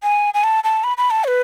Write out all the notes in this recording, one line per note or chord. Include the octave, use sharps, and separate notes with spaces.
G#5
G#5
A5
A5
B5
B5
A5
C#5
B4